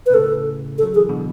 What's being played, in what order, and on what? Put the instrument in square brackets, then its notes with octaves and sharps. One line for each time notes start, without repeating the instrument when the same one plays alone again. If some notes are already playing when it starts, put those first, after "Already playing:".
[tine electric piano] B2 [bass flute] B4
[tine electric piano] A2 C#3 [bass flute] A4
[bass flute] A4
[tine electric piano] F#3
[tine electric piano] E3 [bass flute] G#4
[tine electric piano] B2 D3